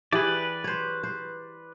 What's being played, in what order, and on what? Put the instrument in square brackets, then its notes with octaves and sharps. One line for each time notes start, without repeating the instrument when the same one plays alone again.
[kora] E3 G4 G#4 [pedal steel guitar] B4 D5
[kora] C5 C#5
C5